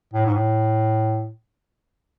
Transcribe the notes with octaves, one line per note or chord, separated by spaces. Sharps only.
A2
G#2
A2